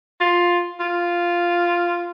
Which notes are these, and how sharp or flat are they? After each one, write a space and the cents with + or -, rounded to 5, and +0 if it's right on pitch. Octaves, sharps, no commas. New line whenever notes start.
F4 +5
F4 -5